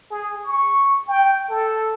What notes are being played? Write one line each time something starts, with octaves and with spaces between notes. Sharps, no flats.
G#4
C#6
G5
A4